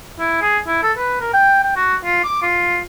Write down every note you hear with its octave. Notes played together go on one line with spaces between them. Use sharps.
E4
G#4
E4
A4
B4
A#4
G5
G5
F#4
F4
D6
F4